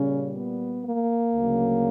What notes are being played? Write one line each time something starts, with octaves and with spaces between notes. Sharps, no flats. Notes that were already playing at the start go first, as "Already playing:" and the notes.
Already playing: A#2 C#3 G3 C#4
B3
A#3
D2 C#3 F#3